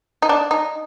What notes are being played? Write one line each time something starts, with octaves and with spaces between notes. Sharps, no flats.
D#4
D4
D#4